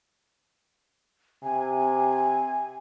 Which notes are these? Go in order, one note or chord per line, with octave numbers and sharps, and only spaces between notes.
C3 G#5